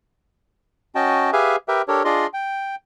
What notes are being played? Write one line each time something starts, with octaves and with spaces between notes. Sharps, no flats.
C#4 F#4 D#5 G5 A5
G4 G#4 B4 E5 F5 G#5
G4 A#4 B4 E5 G5
D4 G4 A4 A#4 C#5
D4 F4 G#4 D5 D#5 C6
G5